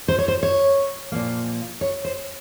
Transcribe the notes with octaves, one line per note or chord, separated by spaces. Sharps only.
C5
C#5
C5
C#5
A#2 F3 A#3
C#5
C5